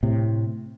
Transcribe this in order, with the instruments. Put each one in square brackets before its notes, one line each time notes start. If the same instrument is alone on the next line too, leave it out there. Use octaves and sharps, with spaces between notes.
[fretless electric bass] A2 C3